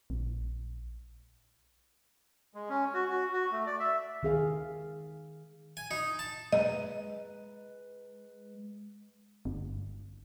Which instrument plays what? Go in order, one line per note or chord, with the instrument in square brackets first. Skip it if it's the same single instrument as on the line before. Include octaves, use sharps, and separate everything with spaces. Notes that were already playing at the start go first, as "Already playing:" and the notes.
[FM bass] A#1
[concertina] G#3
C#4
F#4
F#4
F#4
A3
D5
E5
[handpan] D#3 G#4 F5
[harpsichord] G#5
D#4
A5
[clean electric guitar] G#3 B4 A#5 [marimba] D#5
[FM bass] G1